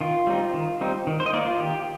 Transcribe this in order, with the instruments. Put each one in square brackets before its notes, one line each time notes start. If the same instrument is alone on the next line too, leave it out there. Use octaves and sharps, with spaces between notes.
[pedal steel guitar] D#3 F4
G3 C4 D#4
D#3
G3 C4 D#4
D#3
C5
D#5
A#3 D#4 D5
F4
D#3 G4